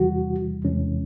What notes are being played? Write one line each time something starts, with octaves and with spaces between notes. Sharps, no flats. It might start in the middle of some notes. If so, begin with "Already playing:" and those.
Already playing: E2 C3 E3 G3 F#4
E2 C3 E3 G#3 C#4